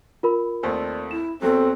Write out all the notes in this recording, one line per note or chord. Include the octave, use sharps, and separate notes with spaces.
F4 A#4 B5
D#2 A3 C4 D5
E4 E7
E2 F#3 C4 A4